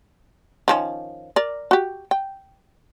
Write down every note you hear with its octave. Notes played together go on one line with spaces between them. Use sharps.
D#3 F3 C#4
A#4 D5
F#4 G4
G5